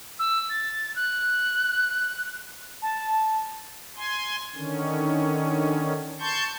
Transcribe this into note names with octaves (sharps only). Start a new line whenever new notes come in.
E6
A6
F#6
A5
G#5 C6
D3 D#3 C#4
A5 C6 C#6 G6